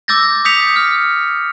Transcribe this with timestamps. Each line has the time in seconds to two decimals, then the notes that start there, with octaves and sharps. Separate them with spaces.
0.08 D6 E6 G6 A6 A#6
0.45 D#6 G6 B6 C#7 F7
0.76 F6